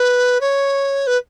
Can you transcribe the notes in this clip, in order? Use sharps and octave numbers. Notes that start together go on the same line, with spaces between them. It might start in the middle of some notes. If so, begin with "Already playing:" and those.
Already playing: B4
C#5
B4